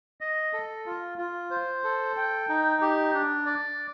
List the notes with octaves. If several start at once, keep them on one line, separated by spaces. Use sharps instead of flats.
D#5
A4
F4
F4
C5
A4
G5
D#4
G4
D4
D5